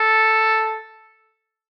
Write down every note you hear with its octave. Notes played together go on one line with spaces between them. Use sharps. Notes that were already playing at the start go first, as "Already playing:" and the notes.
Already playing: A4